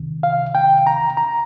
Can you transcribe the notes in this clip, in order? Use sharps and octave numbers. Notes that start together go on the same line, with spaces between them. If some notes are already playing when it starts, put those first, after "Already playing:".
Already playing: C2 C3 D#3
F5
G5
A#5
A#5